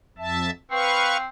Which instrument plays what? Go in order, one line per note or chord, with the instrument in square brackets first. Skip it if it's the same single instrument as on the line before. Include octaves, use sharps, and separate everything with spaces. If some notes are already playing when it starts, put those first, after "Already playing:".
[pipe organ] F2 E5 A5
[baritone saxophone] C4 [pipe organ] B4 F5 C#6